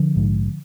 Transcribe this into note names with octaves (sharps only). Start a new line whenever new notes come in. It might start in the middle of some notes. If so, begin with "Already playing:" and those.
Already playing: D3 F3
A#1 G#2